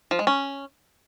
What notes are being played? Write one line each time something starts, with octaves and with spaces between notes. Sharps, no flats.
F3
G#3
C#4